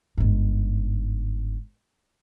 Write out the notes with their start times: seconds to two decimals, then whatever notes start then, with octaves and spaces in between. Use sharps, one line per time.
0.17 G1 G#2